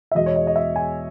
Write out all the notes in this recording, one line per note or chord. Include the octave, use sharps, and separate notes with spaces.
E5
E2 B2 G#3 D#5
C#5
D#5
D#5
E5
G#5